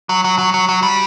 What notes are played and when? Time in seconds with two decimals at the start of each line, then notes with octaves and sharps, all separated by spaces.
0.09 F#3
0.24 F#3
0.38 F#3
0.54 F#3
0.69 F#3
0.83 G3